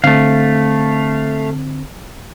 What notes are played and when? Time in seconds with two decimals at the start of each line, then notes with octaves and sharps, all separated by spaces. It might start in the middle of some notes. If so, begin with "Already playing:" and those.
0.04 D3 A3 C4 F5